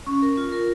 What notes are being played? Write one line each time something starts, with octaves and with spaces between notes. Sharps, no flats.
C#4
A#4
F4
A#4